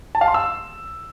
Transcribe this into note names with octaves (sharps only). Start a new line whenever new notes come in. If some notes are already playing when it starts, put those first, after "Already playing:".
A5
F5
C6
E6